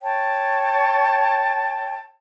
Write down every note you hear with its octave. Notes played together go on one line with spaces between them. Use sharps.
C#5 G5 A5